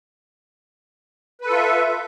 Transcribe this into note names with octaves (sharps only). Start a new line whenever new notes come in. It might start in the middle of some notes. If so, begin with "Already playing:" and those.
F4 A4 B4 E5